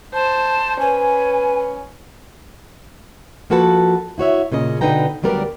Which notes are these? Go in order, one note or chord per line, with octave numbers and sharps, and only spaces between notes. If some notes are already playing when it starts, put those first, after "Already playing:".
C5 A5
C#4 B4 G#5
F3 A#3 F#4 A4 B4 A5
E4 F#4 C#5 E5
A#2 C#3 C#4 D#5
B2 D3 D#4 B4 G5 A#5
D2 F#3 G3 B3 A#4 D5